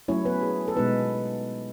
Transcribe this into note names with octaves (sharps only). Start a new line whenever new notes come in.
F#3 A3 C#4 E4 C#5
B3 B4
G#4
A4
B2 G#3 B3 D#4 B4